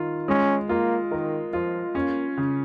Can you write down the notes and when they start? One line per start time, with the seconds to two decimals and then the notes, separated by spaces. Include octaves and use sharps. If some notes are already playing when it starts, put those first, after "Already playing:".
Already playing: D#3 F4
0.28 G#3 C#4
0.69 A#3 F4
1.11 D#3 A#4
1.53 F3 F4
1.95 A#3 C#4
2.37 C#3